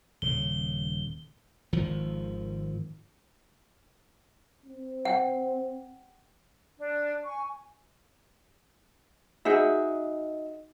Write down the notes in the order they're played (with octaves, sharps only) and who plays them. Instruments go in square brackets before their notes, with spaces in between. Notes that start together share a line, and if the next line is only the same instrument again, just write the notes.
[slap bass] D#1 C#3 [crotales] G7
[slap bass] G#1 D#3 F3
[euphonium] C4
[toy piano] F#5 G5
[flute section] D4
G#5 C#6
[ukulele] D#4 F#4 G#4 E5